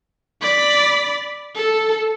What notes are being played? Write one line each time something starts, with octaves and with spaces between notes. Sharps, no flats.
D5 B5
A4